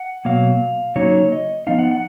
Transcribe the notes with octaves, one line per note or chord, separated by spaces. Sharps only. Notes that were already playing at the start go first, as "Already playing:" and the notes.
Already playing: F#5
B2 F#3 A#3 F5
C#3 F#3 A#3 D#4 C#5
D#5
F3 B3 D#4 F5
F#5
F#5